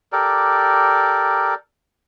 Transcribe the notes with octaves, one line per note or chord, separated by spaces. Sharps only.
G4 A4 A#4 D5